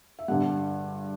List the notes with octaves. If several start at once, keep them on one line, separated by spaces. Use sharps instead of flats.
E5
G2 D3 G3 F#5